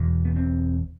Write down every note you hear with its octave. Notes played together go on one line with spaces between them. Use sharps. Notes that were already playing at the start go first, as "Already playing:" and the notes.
Already playing: E1 E2 B2
B3
C4